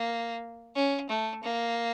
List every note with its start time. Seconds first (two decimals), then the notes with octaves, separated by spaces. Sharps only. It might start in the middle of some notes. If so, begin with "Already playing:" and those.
Already playing: A#3
0.75 C#4
1.09 A3
1.43 A#3